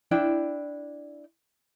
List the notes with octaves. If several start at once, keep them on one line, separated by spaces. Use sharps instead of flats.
D4 E4 G5